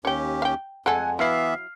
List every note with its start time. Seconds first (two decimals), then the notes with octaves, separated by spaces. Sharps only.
0.05 D#2 C#4 G4 C#5 G5
0.42 F5 G5
0.86 F2 G#3 A3 A4 F#5 G#5
1.19 E3 F#3 B3 E4 E5 F5 F6 C7